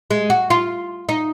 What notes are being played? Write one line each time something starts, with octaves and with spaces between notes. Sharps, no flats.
G#3
F#4
F4
D#4